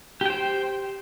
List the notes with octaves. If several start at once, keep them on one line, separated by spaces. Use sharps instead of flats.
G4 C5 G5